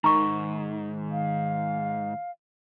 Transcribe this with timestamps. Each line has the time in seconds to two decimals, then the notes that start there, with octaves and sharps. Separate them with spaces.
0.04 G#2 D#3 A#5 C#6
1.12 F5